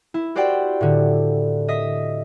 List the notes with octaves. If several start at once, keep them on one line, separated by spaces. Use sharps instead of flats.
E4
F#4 G4 C5 D5 F#5 G5
A2 D3
D#5 E5 D#6 B6